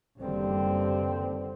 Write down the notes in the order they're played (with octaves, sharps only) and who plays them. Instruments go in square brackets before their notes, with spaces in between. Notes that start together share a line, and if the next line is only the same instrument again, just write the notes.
[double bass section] F#1 D#3 G3 [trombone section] G2 D3 C4